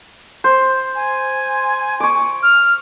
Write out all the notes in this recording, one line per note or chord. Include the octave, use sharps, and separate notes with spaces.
C5
G#5
C#6 D6
F6